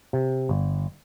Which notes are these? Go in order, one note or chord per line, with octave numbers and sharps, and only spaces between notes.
C3
G1